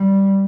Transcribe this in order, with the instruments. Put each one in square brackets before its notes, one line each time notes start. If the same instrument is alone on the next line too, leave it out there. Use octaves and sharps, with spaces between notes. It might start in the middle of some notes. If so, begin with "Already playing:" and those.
Already playing: [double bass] G3